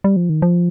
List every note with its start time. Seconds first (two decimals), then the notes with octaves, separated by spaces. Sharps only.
0.04 G3
0.16 F3
0.30 D#3
0.42 F3